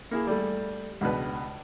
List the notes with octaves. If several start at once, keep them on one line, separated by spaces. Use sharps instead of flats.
A#3 E4 G#4
G3 A3
C#2 B2 D4 B4